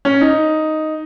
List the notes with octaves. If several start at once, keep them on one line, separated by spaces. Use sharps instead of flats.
C#4
D#4